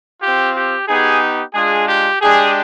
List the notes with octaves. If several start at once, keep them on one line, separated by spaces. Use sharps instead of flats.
C4 F4 G4
G4
B3 D#4 G4 G#4
G#3 D4 F4 G#4
G4
G#3 D4 G4 G#4